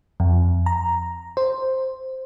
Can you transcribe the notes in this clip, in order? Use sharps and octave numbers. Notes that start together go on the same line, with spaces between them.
F2
A#5
C5